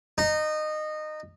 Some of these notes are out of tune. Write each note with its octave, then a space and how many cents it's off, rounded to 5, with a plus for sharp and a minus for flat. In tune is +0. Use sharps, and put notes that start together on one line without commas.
D#4 -20